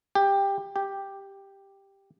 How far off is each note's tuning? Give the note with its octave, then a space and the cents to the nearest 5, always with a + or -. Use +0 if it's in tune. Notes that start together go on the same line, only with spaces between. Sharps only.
G4 +15
G4 +5